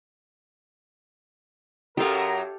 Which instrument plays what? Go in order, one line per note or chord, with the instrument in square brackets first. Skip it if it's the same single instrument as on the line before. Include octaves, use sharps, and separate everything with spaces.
[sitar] F#2 F#3 [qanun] G4 A4 F5 [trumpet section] A#4 A#5